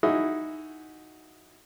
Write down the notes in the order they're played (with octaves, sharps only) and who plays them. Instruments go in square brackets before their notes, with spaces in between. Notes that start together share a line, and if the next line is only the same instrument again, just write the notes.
[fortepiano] D#4 E4 F#4 G#4